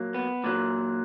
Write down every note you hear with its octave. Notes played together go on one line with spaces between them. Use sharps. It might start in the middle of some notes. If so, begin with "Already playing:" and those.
Already playing: A#2 F#3 A#3
B3
A#2 F#3 A#3